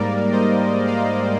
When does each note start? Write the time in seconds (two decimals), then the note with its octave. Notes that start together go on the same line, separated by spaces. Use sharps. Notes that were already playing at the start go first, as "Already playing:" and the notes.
Already playing: G#2 G3 A#3 A#4 D5
0.32 C5 D#5
0.87 D5 F5